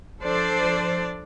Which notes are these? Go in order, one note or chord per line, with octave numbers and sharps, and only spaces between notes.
F3 D4 A4 C5 D5